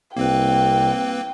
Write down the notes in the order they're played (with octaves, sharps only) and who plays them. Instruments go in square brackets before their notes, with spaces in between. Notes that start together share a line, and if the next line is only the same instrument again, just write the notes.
[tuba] C2 [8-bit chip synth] A#3 C4 B4 [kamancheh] G5